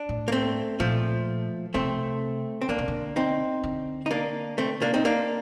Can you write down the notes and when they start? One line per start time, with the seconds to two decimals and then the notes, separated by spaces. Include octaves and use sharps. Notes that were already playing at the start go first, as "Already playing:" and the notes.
Already playing: D4
0.09 A2
0.28 A#3
0.32 A3 C4
0.80 A#2 F3 A3
1.74 C3 A3 C4
2.62 C4
2.69 D3 A#3 D4
2.78 C3
2.88 D3
3.16 C4 D#4
3.63 D3
4.06 D#4
4.11 A#3 D4
4.58 A3 C4
4.82 A#3 D4
4.94 C4 D#4
5.05 A#3 D4